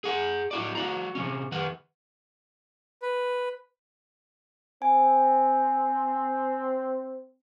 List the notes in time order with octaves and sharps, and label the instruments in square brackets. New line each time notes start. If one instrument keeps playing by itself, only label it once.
[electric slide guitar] G#4 F#5
E4 F#4 D5
F#4 D5 A#5
C3 D#3 C#4
D#3 B4 F#5
[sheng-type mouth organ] B4
[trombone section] C4 [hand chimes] G#5